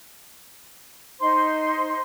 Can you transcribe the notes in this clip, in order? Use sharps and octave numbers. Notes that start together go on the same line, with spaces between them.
D#4 C5 C6